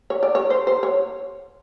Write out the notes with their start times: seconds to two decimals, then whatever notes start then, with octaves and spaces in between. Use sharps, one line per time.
0.10 C#5
0.23 D5
0.35 C#5
0.50 C5
0.67 C5
0.83 C#5